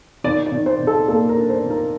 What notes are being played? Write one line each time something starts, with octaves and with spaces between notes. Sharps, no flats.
D#3 D5
D5
D#3
C5
D#3
A4
A#3 A4
A#4
D4
C5
D#3
A#4